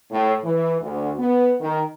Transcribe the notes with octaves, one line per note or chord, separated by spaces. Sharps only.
A2
E3
D2
B3
D#3